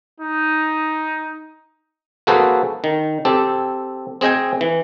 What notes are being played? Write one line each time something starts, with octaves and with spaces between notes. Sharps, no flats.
D#4
A#3 F#4 G#4 A4 B4 C5
D#3
C4 G4 A4
C4 G#4 D#5 G5 G#5
E3